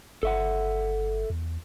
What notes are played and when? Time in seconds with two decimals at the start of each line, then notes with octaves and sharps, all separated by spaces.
0.23 G1 A4 E5 F#5
1.30 E2